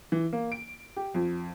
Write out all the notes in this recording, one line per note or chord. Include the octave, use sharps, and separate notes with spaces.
E3
A#3
D7
G4
F2